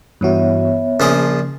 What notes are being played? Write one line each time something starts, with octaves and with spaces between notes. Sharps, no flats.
G2 E3 B3 F#4 C#5 E5
A#1 C#3 F3 G#4